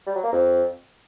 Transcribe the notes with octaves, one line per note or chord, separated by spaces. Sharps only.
G3
F#3
A#3
F2